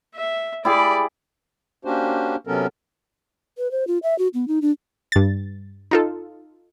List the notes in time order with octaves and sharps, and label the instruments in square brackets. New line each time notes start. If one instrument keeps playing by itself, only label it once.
[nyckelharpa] E5
[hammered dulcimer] E4 G4 G#4 [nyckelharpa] D5 B5
[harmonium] A#3 C#4 D4 F#4 G4 C5
C3 F#3 B3 C#4 A4 A#4
[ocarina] B4
C5
F4
E5
F#4
B3
D#4
D4
[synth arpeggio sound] G2 A6
D#4 F4 A4